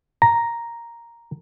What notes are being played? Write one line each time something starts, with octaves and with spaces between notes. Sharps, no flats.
A#5